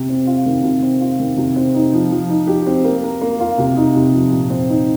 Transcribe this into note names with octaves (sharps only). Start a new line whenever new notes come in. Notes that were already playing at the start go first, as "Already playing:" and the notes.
Already playing: C3
C4
F4
D#3
C3
C4
F4
D#3
C3
C4
D#4
F3
F3
D#4
G4
C4
A#3
A#4
A#3
F4
C3
D#4
C3
F3
A#2
C4
D#4